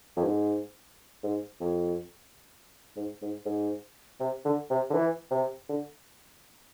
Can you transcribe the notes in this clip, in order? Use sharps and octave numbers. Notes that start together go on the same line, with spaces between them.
F2
G#2
G#2
F2
G#2
G#2
G#2
C3
D3
C3
D3
E3
C3
D3